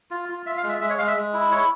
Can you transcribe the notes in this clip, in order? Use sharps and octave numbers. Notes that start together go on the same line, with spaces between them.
F4
F4
F4 E5
F5
G#3
E5
G#3 E5
C#5
G#3 F5
E5
G#3
E4
E4 C#5